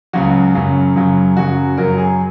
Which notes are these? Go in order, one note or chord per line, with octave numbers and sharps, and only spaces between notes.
C#2 C#3 F#3 F#4
F#2 C#3 F#3
F#2 C#3 F#3
F#2 C#3 F#3 F#4
F#2 C#3 F#3 A#4
G#4